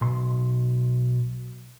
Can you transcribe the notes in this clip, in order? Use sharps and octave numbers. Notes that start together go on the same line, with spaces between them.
B1 C6